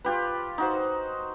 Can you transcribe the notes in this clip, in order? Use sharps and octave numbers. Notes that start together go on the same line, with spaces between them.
F4 G4 B4
D#4 F#4 C5